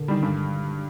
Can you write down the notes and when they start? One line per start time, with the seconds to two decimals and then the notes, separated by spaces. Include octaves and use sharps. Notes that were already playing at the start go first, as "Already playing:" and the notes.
Already playing: A#2 D3
0.08 D#3 G3
0.22 G2